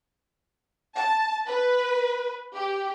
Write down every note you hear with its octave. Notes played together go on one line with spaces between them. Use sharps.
A5
B4
G4